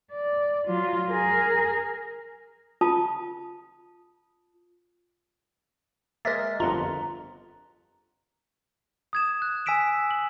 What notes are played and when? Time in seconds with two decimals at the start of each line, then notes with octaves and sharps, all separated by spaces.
0.12 D5
0.67 F#3 F4
1.11 G#4 A#4
2.81 F4 A5 D#6
6.25 G#3 A#3 A#4 D#5 E5 A6
6.60 G1 F2 F4 F#5 A#5
9.13 D#6 G#6 E7
9.42 F#6
9.66 G#5 E6 B6 D7 E7
10.11 F#7